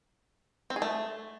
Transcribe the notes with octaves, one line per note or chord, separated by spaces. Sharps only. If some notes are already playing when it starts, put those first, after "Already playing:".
C4
G#4
A3